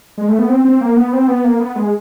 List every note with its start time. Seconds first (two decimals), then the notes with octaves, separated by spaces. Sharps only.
0.18 G#3
0.28 A3
0.39 B3
0.49 C4
0.65 C4
0.81 A#3
0.97 B3
1.13 C4
1.28 B3
1.44 A#3
1.60 B3
1.76 G#3